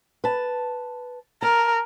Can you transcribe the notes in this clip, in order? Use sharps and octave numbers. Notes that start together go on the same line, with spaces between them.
B4 A5
A#4 A5